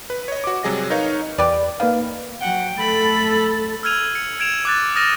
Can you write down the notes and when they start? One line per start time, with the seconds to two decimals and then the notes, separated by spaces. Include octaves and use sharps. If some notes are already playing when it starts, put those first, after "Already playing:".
0.10 B4
0.28 C#5 D#5
0.44 F#4 D6
0.63 C3 F#3 G3 G#4 D#5 A#6
0.90 D#4 A#4 B4 C#5 D#5 F5
1.38 E2 G4 B4 D5
1.80 D#3 A#3 B4 F5
2.41 F#3 F#5 G5
2.78 A3 A4 B5
3.83 E6 F6 G#6 D#7 F7
4.15 C#7
4.40 G#6 D7 E7 F7
4.65 D6 F#6 A6
4.95 D#6 F6 A6 A#6 D#7 E7